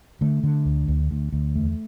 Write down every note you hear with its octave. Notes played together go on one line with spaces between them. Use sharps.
D3 A3
D3
D2
D2
D2
D2
E2 A3